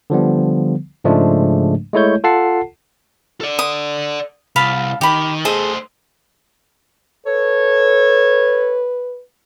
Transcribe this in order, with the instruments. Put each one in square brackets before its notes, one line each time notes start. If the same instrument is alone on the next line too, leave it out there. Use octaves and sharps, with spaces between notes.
[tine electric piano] D3 F3 G3 B3
G#2 C#3 F3 G#3 A3 D4
G#3 A3 E4 C#5 G6
F4 A4 F#5 A5 C7
[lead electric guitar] A4 D5
[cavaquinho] D#6
[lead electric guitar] C2 [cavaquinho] F5 A5 B5
[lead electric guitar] D#3 [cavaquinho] G4 B5
[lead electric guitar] A3 C5 [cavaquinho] G#4 A4 D#5
[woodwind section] A4 C#5 [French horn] B4